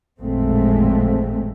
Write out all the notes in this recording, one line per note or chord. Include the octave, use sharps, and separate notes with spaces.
A1 F2 A#2 G#3 A3 C4